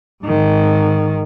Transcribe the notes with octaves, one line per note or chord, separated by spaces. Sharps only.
G#2 D#3